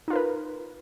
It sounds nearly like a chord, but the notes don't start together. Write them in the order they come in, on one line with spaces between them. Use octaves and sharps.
D#4 F4 A#4 B4